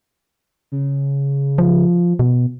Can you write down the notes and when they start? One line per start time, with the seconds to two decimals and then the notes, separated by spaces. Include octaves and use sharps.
0.72 C#3
1.58 F3
2.19 B2